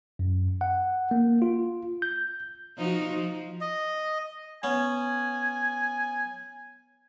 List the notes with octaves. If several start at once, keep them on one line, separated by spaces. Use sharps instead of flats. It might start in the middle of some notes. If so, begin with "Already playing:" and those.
F#2
F#5
A#3
F4
G6
F3 D#4 F#4
F3
D#5
B3 C#4 G#5